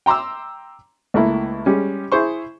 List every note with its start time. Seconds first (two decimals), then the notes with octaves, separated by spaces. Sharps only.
0.06 G5 A#5 C6 D6 E6
1.14 C#2 A3 A#3 E4
1.66 G3 G#3 C#4
2.12 E4 G#4 C5 C#6